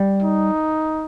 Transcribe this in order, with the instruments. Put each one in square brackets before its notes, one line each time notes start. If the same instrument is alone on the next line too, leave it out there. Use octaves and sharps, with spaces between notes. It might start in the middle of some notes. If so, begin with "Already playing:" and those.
Already playing: [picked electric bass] G3
[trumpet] D#4